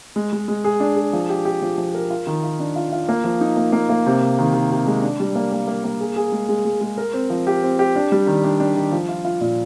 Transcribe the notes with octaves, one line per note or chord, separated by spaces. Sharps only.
G#3
G#3
G#3
G#4
D4
G#4
F3
G4
G4
F3
F3
A#4
F4
D#3
F4
D4
F4
F4
A#3
F3
D#4
A#3
A#3
A#3
C3
C3
D#3
D#3
C3
G#3
D4
G3
A#3
A#3
A#3
A#3
G#4
G#4
G#3
G#3
G#3
G#3
A#4
C4
F3
G4
C4
G4
D4
G3
D#3
D4
D4
D#3
F3
F4
F4
A#2